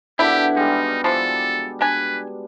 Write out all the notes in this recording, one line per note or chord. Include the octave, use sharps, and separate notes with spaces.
B2 D3 D4 E4 G4
G3 G#3 D#4
E3 F3 A4
D4 B4 G#5